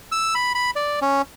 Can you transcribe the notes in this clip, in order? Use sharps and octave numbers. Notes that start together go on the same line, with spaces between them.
E6
B5
B5
D5
C#4